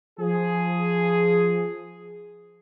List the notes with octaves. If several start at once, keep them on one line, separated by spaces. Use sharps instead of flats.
F3 G#4